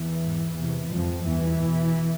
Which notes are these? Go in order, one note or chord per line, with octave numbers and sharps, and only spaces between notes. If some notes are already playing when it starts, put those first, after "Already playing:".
Already playing: E2 E3
G#2
E2 C3
F2 G#2 F3
E2 G2 E3
E2 B2